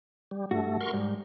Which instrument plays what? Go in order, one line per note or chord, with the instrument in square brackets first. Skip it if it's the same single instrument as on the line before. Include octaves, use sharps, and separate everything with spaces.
[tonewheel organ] G3
[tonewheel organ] G2 A3 [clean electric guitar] F#4
[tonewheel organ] A#4 C6 C#6
[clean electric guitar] G#2 [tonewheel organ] G3